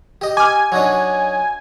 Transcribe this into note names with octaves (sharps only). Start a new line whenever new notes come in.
G4 D#5
G#5 D6 F6
F#3 D4 D#4